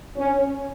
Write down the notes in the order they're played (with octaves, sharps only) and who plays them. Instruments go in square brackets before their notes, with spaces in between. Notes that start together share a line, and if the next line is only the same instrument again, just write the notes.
[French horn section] C#4